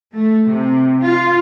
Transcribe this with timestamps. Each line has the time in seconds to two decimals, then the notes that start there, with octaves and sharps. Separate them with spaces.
0.14 A3
0.48 C3
1.02 F4